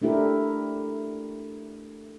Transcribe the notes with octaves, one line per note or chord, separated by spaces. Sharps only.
A3 D4 E4 G4 A#4